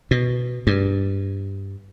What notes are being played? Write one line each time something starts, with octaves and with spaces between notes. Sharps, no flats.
B2
G2